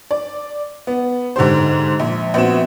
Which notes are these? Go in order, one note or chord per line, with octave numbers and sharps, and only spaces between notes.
D5
B3
G#2 D3 G4 C5
A#1
A#1 B3 C4 F#4 E7